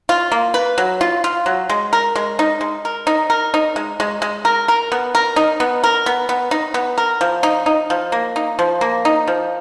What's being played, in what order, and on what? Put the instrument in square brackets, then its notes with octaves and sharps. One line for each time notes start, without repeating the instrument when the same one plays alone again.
[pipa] F4
A#3
B4
F#3
F4
F4
F#3
G#3
A#4
G#3
D#4
G#3
A#4
D#4
A#4
D#4
G#3
G#3
G#3
A#4
A#4
B3
A#4
D#4
B3
A#4
B3
B3
D#4
B3
A#4
F3
D#4
D#4
F3
A#3
D#4
F3
A#3
D#4
F3